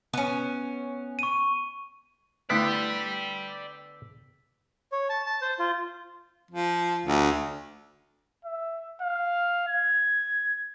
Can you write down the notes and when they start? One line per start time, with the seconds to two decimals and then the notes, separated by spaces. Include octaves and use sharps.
0.14 B3 C#4
1.19 C#6 D#7
2.50 D3 A3 B3 E4 D5 G5 E6 B6
4.92 C#5
5.09 A5
5.26 A5
5.42 C5
5.59 F4
6.51 F3
7.05 D2
8.45 E5
9.02 F5
9.68 G#6